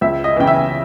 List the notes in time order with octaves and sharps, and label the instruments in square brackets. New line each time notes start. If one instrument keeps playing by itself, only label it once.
[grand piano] C#2 E5
D#5
C#3 E3 G5
E5